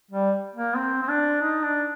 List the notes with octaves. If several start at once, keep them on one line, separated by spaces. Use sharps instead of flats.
G3
A#3
C4
C4
D4
D#4
D4